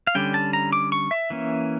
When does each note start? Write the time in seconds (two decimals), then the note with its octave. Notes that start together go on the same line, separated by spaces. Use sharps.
0.07 F5
0.15 D3 G3 C#4 G5
0.34 A5
0.53 A#5
0.73 D6
0.92 C#6
1.11 E5
1.30 E3 A#3 C#4